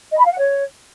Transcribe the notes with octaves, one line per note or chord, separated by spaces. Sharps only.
D#5
B5
F5
F#5
C#5